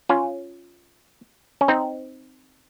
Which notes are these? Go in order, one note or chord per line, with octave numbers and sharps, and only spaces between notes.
C#4 F4
C#4
C4 D#4